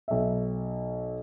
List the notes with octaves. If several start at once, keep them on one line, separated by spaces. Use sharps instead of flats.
B1 E5